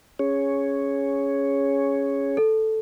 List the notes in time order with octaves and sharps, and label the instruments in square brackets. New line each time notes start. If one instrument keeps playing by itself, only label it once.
[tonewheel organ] C#4 G#4 C#5
[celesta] A4